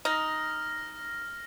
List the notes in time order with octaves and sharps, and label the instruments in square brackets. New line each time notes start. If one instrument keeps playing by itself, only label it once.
[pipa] D#4 [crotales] F6 A#6